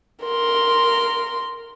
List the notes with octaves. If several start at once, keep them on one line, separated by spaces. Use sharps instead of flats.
A#4 C6